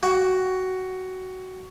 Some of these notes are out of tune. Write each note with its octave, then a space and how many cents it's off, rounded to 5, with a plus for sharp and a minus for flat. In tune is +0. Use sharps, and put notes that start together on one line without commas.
F#4 +10 G5 +0